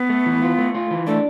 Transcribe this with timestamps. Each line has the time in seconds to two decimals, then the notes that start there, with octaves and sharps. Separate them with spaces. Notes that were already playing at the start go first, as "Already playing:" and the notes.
Already playing: B3
0.10 A3
0.26 E3
0.42 F4
0.58 A3
0.74 F4
0.91 E3
1.07 A3 D4